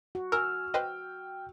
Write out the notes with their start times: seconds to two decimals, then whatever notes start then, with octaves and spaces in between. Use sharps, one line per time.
0.15 F#4
0.32 A#4 G#5 E6 F6
0.74 B4 C5 D#5 G5